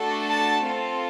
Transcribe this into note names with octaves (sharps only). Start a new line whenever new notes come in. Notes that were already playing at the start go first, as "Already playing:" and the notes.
Already playing: A3 D4 F#4 A4
A5
C4 F4 A4